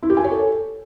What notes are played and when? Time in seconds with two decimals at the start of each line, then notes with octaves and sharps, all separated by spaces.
0.03 E4
0.10 G4
0.17 G#5
0.24 C#5
0.31 A4